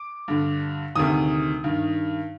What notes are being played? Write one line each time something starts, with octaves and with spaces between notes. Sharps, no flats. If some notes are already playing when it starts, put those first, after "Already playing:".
Already playing: D6
G2 D3
D2 C3 D#3 D#6
G2 D#3